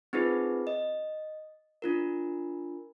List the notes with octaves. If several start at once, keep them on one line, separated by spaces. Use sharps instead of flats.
C4 D#4 F4 G#4 B4
D#5
D4 F4 A#4